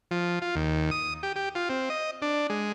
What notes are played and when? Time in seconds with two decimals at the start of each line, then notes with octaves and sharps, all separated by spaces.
0.11 F3
0.42 F4
0.55 D#2
0.91 D#6
1.23 G4
1.36 G4
1.55 F4
1.70 C4
1.90 D#5
2.22 D4
2.50 G#3